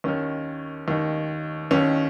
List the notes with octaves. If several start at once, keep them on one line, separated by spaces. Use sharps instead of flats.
D#2 D#3 C#4
D#2 D#3
D#2 D#3 C#4